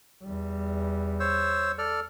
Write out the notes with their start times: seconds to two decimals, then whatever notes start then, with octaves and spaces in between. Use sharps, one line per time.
0.23 E2 G3
1.20 C5 C#5 E6
1.78 A4 D5 F6